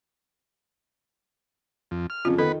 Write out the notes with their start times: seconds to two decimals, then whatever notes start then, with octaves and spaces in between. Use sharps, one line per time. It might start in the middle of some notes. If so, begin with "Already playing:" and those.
1.91 F2
2.10 F6
2.25 F2 C#3 F4
2.38 D#3 B3 A4 B4